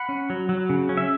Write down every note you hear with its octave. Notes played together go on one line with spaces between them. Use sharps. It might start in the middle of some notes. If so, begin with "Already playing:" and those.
Already playing: F#5 B5
C#4
F#3
F#3
C#3
C#4
E5